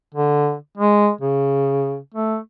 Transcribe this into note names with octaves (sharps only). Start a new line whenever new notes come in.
D3
G#3
C#3
A3